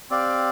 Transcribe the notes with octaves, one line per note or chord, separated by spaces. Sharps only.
C4 G4 D5 F5